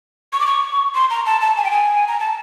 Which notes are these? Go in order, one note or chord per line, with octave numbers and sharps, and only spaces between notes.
C#6
D6
C#6
C6
A#5
A5
A5
G#5
G5
G#5
A#5
A5